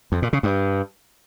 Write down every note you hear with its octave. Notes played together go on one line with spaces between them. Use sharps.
F2
A#2
C#3
G2